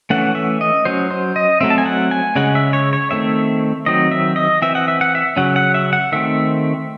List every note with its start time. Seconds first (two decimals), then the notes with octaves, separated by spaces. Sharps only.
0.10 E3 A3 C#4 F#5
0.35 E5
0.61 D#5
0.85 F#3 C#4 C5
1.11 C5
1.36 D#5
1.61 F#3 A3 C4 E5
1.70 A5
1.78 G#5
1.86 F#5
2.11 G#5
2.35 C#3 G#3 C#4 F#5
2.55 E5
2.73 C#5
2.93 C#5
3.11 D#3 A3 C4 E5
3.86 D#3 F#3 C4 D#5
4.12 E5
4.36 D#5
4.62 E3 C4 E5
4.75 F#5
4.88 E5
5.01 F#5
5.15 E5
5.36 C#3 F#3 C#4 F#5
5.56 F#5
5.74 E5
5.93 F#5
6.12 D#3 A3 C4 E5